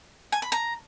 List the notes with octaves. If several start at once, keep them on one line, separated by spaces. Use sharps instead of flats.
G#5
B5
A#5